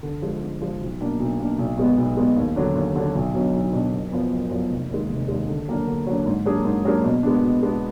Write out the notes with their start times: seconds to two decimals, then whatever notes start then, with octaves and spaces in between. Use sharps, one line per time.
0.03 D3
0.22 F3 G#3
0.42 D3
0.61 F3 G#3
0.80 B1
1.01 B2 A#3 D4
1.20 B1
1.39 B2 A#3 D4
1.58 B1
1.78 B2 G#3 B3
1.97 B1
2.16 B2 G#3 B3
2.36 D#2
2.56 D3 F#3 D4
2.75 D#2
2.96 D3 F#3 D4
3.15 B1
3.34 B2 F#3 D4
3.54 B1
3.73 B2 F#3 D4
3.92 F#1
4.11 F#2 F3 B3
4.32 F#1
4.51 F#2 F3 B3
4.70 F1
4.90 D#2 D#3 G#3
5.09 F1
5.28 D#2 D#3 G#3
5.48 D3
5.68 F#3 A#3 D4
5.87 D3
6.07 F#3 A#3 D4
6.26 G#2
6.46 F#3 A#3 D4 G#4
6.65 G#2
6.85 F#3 A#3 D4 G#4
7.04 B2
7.23 G#3 B3 D4
7.43 B2
7.63 G#3 B3 D4